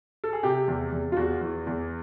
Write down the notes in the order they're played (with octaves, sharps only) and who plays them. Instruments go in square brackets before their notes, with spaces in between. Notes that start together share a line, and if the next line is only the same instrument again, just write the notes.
[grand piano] A4
G#4
C3 G4
E2
E2
F4
E2 F#4
E3
E2